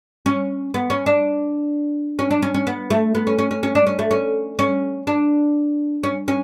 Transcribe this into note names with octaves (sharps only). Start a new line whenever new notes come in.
C#4
B3
C#4
D4
C#4
D4
C#4
C#4
B3
A3
B3
C#4
C#4
C#4
C#4
D4
C#4
A3
C#4
C#4
D4
C#4
C#4